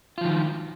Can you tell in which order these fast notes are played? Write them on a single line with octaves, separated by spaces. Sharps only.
F4 F3 D#3